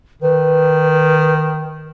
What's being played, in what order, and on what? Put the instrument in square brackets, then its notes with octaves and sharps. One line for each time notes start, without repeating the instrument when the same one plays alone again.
[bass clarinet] D#3 [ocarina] B4